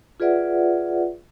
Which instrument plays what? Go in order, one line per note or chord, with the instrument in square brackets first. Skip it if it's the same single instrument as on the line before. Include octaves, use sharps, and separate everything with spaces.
[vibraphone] F4 G#4 B4 D5 E5 F#5